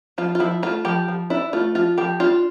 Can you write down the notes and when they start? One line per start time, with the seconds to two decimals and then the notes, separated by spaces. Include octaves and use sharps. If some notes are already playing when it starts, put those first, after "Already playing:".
0.18 F3 F4
0.35 F4
0.40 F3 E4
0.63 A3 F4
0.85 F3 G4
1.08 F3
1.30 D4 E4
1.53 A3 F4
1.75 F3 F4
1.98 F3 G4
2.20 D4 F4